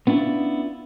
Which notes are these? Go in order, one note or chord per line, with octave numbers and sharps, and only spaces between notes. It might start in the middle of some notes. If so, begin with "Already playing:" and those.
B3 C#4 D4 E4 F4